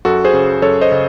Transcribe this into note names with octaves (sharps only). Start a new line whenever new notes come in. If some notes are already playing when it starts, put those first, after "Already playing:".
F#2 F#4 A4
G#4 C5
C#3
F#2 A4 C#5
C5 D#5
C#3